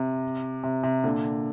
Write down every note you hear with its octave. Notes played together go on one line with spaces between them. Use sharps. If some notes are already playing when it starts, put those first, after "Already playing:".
Already playing: C3
C3
C3
A#2 D3